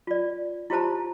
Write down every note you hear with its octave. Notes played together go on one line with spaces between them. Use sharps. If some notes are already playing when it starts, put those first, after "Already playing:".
F4 D5
E4 F4 G4 C5 A5 A#5